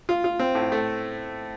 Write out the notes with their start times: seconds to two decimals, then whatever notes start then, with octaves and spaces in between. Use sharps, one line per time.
0.09 F4
0.24 F4
0.39 C4
0.55 A2
0.72 A3